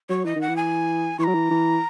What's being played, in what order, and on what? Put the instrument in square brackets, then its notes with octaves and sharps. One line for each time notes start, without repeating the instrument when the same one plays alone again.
[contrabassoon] F#3 [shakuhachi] C#5
[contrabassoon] E3 [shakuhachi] D#5
[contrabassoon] D#3 [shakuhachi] F#5
[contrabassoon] E3
[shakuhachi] G#5
[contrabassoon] E3 [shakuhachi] C#6
[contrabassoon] F#3 [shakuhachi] A#5
[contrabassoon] E3
E3